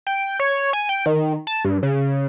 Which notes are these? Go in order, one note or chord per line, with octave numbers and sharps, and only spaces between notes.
G5
C#5
G#5
G5
D#3
A5
G2
C#3